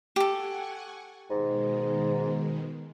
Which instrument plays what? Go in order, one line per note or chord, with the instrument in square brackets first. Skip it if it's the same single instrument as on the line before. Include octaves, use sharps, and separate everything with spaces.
[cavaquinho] G4 A4 [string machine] F#5 G#5 C#6
[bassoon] G#2 [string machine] B2 D#3 G#3